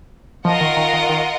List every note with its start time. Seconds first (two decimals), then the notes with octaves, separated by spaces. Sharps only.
0.45 F3 F4 A#4 D#5 F#5
0.61 D#3
0.76 D#3
0.93 D#3
1.09 D#3